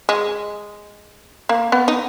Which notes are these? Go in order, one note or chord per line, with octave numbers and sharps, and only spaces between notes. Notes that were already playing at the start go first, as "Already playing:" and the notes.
G#3
A#3
B3
D#4